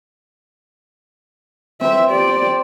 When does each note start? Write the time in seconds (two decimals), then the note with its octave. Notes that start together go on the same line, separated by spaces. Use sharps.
1.81 C4 C5 E5
2.11 G4 D5